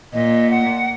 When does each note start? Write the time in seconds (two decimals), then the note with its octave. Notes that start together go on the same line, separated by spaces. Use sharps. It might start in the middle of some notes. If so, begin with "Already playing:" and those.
0.13 A#2 D#5
0.51 F#5